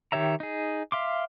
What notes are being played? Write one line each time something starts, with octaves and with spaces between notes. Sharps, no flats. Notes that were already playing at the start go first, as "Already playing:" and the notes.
D#3 G4 C#5 E5 A#5
D#4 G#4
E5 F5 C6 D6